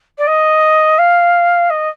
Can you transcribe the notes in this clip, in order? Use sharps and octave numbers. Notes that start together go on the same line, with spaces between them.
D5
D#5
F5
D#5